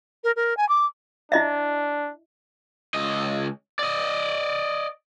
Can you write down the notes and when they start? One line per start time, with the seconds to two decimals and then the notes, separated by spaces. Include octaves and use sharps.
0.24 A#4
0.36 A#4
0.57 G#5
0.69 D6
1.32 D4 E4 D#5 E5
2.94 C#2 D#5
3.79 D5 D#5